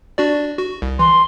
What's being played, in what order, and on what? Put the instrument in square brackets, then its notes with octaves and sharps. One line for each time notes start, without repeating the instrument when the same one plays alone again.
[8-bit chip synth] D4 F#4 D5
F#4
C2
[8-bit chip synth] E3 [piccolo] C6